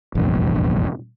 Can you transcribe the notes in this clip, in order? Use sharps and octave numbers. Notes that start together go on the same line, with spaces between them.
F1 A#1 E2 G2